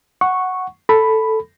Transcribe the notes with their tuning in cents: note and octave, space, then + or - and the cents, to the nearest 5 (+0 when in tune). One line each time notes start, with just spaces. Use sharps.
F#5 +0 C#6 -5
A4 +0 B5 +0